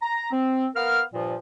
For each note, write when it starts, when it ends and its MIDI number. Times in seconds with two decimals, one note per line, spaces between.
0.02 0.28 82
0.31 0.66 60
0.75 1.02 59
0.75 1.02 70
0.75 1.02 77
0.75 1.02 89
1.14 1.36 43
1.14 1.36 46
1.14 1.36 53